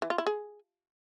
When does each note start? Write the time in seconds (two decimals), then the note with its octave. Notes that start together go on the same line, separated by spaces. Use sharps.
0.02 E3
0.10 F4
0.18 E4
0.27 G#4